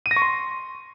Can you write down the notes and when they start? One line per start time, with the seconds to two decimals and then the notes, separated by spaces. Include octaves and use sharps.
0.06 D#7
0.11 A#6
0.16 C#6
0.22 C6